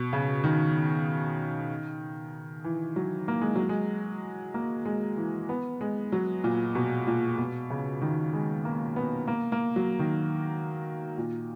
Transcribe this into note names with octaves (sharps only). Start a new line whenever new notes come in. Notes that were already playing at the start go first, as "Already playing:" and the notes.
Already playing: B2
C#3
D#3
E3
F#3
A#3
G#3
F#3
G#3
A#3
G#3
E3
B3
G#3
F#3
A#2
B2
A#2
B2
C#3
D#3
G#3
A#3
B3
A#3
A#3
F#3
D#3
A#2